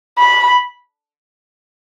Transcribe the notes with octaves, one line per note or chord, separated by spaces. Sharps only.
B5